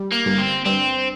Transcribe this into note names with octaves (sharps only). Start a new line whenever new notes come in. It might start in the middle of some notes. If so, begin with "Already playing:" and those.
Already playing: G3
A#3
G1
C4
G2 C4